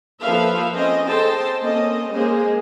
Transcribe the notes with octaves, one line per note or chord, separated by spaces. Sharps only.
F3 A#3 A4 B4 E5 F5
C4 C#4 D#5
G#4 A4 C5 D#5 G5 A5
A#3 C4 C#4 A4 D#5
G#3 A#3 C#4 G#4 C5 D#5